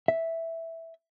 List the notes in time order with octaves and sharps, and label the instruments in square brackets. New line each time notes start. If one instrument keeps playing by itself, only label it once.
[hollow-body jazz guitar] E5